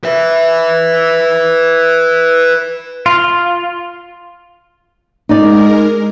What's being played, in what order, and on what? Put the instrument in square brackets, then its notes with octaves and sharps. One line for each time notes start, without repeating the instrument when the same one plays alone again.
[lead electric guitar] B4 E5
[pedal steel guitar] F4
[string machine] G#3 A#4 [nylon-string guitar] D#4 D5